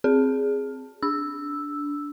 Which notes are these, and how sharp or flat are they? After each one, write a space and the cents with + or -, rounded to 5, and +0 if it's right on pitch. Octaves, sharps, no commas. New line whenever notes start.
C4 +0 G#4 +0
D4 -15 E6 +0